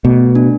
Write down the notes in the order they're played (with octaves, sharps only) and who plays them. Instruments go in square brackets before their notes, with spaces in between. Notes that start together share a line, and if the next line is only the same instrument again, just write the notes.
[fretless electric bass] B2 [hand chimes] A3
[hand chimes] D4